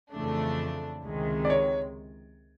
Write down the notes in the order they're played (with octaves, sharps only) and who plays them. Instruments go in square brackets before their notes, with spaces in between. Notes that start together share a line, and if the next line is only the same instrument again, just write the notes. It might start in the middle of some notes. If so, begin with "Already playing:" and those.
[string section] F2 C#3 E3 A3 D4
C#2 C3 D#3 G#3
[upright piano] D5
C#5